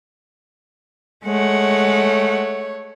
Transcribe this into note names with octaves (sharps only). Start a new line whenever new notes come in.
G#3 A3 C#5 F#5